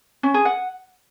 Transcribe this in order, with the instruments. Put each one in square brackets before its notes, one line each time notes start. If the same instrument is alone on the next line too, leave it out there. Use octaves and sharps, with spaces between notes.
[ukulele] C#4
G#4
F#5